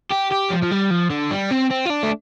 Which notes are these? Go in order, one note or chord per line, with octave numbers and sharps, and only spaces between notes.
G4
G4
F3
F3
G3
F3
D3
G3
C4
C4
F4
D4
A3